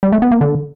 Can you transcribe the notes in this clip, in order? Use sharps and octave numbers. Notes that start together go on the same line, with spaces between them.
G3
A3
B3
A#3
D3